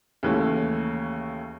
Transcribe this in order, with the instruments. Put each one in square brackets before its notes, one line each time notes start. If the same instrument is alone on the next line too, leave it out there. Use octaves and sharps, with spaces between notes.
[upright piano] D#2 C#3 E3 A3 C#4